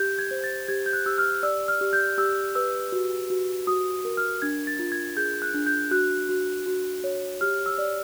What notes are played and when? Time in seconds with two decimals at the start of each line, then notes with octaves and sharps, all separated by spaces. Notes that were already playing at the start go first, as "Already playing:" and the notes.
Already playing: G4 G6
0.19 G#6
0.31 C5
0.44 A6
0.69 G4 G#6
0.86 G6
0.93 F#6
1.06 G4 E6
1.18 F6
1.43 D5 E6
1.68 F6
1.81 G4
1.93 G6
2.18 G4 E6
2.55 B4 E6
2.92 F#4
3.30 F#4
3.67 F#4 D#6
4.05 A#4
4.17 F6
4.42 D4 G#6
4.67 A6
4.79 F4
4.92 G#6
5.17 G#4 G6
5.42 F#6
5.54 D4
5.66 G6
5.91 F#4 F#6
6.29 F#4
6.66 F#4
7.04 C#5
7.41 G4 F6
7.66 E6
7.78 D5